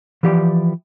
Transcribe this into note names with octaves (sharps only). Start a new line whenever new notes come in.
E3 F3 G4 D5